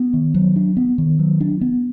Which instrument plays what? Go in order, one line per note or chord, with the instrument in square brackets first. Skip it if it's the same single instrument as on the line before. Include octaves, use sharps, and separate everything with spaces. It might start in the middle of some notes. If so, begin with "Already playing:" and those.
Already playing: [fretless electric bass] B3
D#3
F#3
D4
B3
D#3
F#3
D4
B3